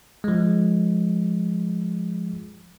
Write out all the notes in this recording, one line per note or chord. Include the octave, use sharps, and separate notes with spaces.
F3 G#3